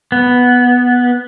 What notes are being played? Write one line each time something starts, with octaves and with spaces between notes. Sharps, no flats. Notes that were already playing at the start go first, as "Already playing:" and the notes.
B3